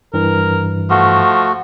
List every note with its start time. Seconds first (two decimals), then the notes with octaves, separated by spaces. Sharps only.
0.14 G2 E3 A#4
0.90 F3 A3 F#4